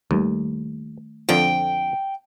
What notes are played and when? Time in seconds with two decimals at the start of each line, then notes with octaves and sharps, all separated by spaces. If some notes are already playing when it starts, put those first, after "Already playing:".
0.11 D#2 D#3 G3 A3
1.29 F2 D3 F3 G5